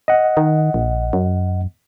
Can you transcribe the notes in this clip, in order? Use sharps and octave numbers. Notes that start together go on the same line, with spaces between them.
D#5 F#5
D#3
A#1
F#2